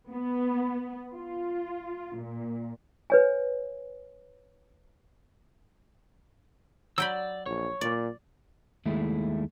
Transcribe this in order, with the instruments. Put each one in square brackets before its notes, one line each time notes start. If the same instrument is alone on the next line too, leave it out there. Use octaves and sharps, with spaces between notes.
[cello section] B3
F4
A#2
[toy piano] B4 C#5 G#5
[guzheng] F#3 G5 B5 [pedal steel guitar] D5 E6
[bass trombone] A#1 [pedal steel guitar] C#5
[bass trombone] A#2 [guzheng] D5
[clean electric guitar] D#2 G#3 A3 E4